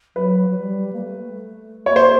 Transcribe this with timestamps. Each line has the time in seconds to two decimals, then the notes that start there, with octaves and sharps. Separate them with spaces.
0.16 F#3 B4
0.49 F#3
0.58 G3
0.92 A#3
1.01 A3
1.86 A#3 C#5
1.96 C5